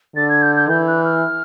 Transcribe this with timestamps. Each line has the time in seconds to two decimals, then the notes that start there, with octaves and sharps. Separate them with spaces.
0.15 D3 A6
0.29 G#6
0.41 G6
0.55 G6
0.68 E3 G6
0.87 F#6
1.04 F6